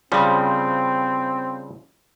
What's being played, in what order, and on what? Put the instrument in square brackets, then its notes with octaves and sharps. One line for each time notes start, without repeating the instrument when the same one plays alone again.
[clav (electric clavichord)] C#3 F3 G3 [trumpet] C4